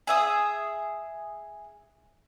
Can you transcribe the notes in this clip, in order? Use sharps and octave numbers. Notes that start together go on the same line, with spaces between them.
G#4 E5 D#6